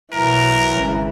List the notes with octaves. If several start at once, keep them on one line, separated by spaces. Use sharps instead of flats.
B1 E3 F#3 A#4 A#5
G#1 C#3